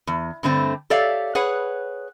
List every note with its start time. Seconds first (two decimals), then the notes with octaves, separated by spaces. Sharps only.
0.07 E2
0.43 G2 D3 A3 C4
0.90 G4 A4 C#5 D5 E5 F5
1.35 G#4 B4 C#5 F#5